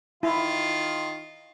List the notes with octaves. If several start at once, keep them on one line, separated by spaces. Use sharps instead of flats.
D#3 E4 F4